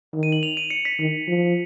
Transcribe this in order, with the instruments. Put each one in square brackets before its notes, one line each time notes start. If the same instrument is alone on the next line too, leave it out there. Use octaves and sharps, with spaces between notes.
[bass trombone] D#3
[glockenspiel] D#7
F#7
F7
D#7
C#7
B6
[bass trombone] D#3
F3